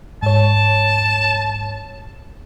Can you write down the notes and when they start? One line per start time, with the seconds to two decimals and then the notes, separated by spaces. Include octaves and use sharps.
0.22 G#2 C#5 A5